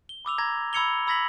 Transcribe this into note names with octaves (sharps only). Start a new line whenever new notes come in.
G7
B5 D6 E6 F7
A#5 G#6 A#6
B5 E6 G#6 C#7 F7 G7
B5 E6 G#6 A#6 B6 F#7